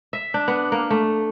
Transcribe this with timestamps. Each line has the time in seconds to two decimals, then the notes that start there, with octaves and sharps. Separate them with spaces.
0.13 E5
0.34 D4
0.48 B3
0.72 A#3
0.90 A3